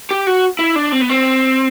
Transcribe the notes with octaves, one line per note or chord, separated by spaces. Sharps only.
G4
F#4
E4
D4
C4
B3
C4